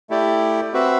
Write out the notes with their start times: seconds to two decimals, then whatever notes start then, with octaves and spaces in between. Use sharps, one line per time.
0.10 A3 E4 G4 D5
0.73 C4 F#4 B4 E5